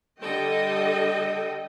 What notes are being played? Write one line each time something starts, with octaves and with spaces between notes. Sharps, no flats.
D3 G3 A4 D#5 G5